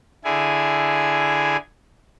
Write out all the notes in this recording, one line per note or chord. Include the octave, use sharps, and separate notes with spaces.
D3 E4 G#4 G#5